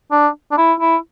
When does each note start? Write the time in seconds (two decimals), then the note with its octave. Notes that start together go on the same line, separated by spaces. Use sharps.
0.12 D4
0.51 D4
0.57 E4
0.80 E4